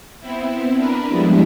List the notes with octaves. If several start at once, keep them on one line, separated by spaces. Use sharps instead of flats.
B3 C4 E4
D4 A#4 B4
F3 G3 G#3 B3 D4 E4